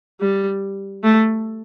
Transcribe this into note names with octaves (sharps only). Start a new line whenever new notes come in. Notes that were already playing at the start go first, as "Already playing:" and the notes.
G3
A3